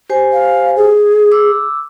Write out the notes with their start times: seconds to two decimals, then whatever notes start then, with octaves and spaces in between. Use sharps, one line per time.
0.10 G4 C5 G#5
0.33 F5
0.77 G#4
1.31 D6 E6